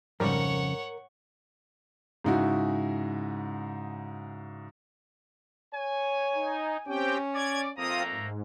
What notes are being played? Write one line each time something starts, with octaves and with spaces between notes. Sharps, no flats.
F2 G#2 C#3 G3 A#4 C#5 F#5
G#2 C#3 D#4 E4 F#4
C#5 G#5
D#4
C4 C#4 G4 G5
D5 G#6
F2 A3 A#3 C4 F4 A#5 D#6
G#2